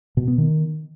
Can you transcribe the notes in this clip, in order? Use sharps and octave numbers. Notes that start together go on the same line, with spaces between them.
B2
B3
D#3